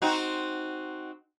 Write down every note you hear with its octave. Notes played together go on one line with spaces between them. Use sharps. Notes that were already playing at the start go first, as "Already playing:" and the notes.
C4 D#4 F#4